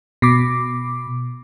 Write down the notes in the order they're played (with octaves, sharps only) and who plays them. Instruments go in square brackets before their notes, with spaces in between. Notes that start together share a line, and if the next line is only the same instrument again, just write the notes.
[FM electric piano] B2 D6